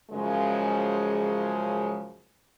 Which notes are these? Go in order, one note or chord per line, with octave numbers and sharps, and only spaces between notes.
F#2 C#3 F3 G#3